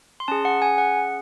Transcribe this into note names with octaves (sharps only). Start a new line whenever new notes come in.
C6
C#4 G#4 A5
F#5
G#5
F#5